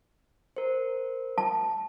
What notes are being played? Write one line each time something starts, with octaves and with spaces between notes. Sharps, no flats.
A#4 C5
A5